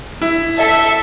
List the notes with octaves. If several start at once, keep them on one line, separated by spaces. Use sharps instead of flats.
E4
A4 E5